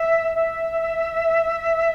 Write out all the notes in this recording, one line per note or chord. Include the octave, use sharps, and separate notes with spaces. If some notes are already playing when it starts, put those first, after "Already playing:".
Already playing: E5
E5